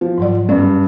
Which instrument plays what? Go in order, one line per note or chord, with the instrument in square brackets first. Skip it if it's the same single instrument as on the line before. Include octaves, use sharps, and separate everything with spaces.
[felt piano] F3
[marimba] G#2 F#3 D5
[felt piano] G2 [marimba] C#4 D5